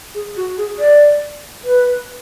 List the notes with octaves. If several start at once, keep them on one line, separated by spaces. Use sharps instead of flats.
G#4
F#4
G#4
D5
B4